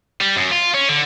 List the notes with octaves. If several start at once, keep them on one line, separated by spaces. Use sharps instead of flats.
G3
F#2
F4
C#4
D3